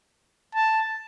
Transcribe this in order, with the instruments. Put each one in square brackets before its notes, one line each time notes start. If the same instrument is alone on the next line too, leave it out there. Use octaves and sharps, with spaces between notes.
[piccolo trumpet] A5